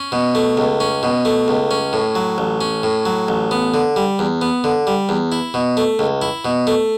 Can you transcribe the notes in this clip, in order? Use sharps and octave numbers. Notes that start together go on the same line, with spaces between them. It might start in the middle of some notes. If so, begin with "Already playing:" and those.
Already playing: C#4
B2
A3
C#2
C#4
B2
A3
C#2
C#4
A2
F#3
A1
C#4
A2
F#3
A1
B3
D3
G3
E2
B3
D3
G3
E2
E4
B2
A3
C#2
E4
B2
A3